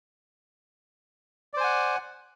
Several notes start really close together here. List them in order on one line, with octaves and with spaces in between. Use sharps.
D5 C5 G#5 F#5